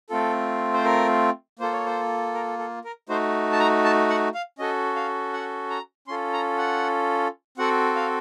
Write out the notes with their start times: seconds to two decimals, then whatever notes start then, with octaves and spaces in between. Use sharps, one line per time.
0.10 A3 C4 F4 A4
0.74 C5
0.85 A#4
1.59 A#3 F4 A4 C5
1.73 C#5
1.86 C5
2.34 A#4
2.59 A4
2.84 A#4
3.09 A3 D#4 F#4 C5
3.52 A5
3.59 A#5
3.84 A5
4.09 F#5
4.34 F5
4.59 C#4 F#4 A4 D#5
4.96 F5
5.33 F#5
5.70 A#5
6.08 C#4 F4 A4 C6
6.33 A#5
6.58 F#5
7.58 C4 F#4 A4 F#5
7.95 F5